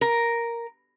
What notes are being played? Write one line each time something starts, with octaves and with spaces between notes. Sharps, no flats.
A#4